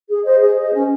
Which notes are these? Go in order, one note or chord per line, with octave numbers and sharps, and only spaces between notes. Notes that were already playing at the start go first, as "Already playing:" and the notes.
G#4
C5 D#5
G#4
C5 D#5
C#4